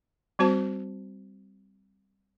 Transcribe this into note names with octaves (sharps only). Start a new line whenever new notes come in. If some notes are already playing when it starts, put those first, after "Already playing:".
G3 C4 F#4 C5 A5